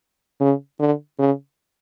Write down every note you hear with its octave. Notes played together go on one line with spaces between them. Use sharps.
C#3
D3
C#3